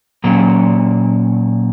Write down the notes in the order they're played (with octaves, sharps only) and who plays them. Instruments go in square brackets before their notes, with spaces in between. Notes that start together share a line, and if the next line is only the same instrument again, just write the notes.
[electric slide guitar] A#2 F#3 A#3 C#4